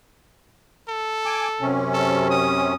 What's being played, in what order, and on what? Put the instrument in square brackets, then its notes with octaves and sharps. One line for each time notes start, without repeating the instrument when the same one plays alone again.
[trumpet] A4
[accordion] G#5 D6
F#2 C3 C#4
[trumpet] A4
D#6